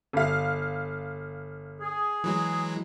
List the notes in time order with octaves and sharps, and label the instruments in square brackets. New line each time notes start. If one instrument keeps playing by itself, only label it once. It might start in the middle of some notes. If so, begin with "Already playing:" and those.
[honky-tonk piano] G1 F5
[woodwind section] G#4
[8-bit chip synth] E3 F#3 G#3